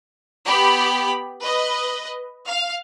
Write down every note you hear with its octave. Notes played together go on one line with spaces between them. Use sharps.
B3 G4 B5
B4 D#5
F5